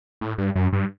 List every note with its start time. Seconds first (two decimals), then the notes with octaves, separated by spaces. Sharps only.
0.21 A2
0.38 G2
0.56 F#2
0.73 G2